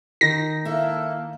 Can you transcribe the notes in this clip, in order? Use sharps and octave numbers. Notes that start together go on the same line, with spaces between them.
D#3 D#4 A#6
A#3 E4 A4